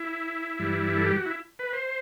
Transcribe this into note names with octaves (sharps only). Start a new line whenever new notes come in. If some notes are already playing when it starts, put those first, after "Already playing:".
Already playing: E4
G2 E3 G3
A4
G4
F#4
E4
B4
C5